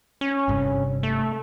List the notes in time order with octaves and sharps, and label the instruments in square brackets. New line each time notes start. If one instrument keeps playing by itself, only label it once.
[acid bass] C#4
[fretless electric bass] G1 G2 C3
[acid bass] A3